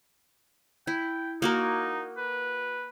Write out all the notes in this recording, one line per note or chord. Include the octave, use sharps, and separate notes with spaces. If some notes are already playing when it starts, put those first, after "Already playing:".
E4 G5
A#3 D#4 F#4 A#4
B4